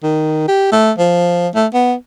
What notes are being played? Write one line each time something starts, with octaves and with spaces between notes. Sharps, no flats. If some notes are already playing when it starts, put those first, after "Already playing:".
D#3
G4
A3
F3
A3
B3